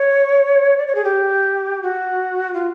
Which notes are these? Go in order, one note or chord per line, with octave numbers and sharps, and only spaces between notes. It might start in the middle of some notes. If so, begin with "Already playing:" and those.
Already playing: C#5
D5
C#5
G#4
G4
F#4
F4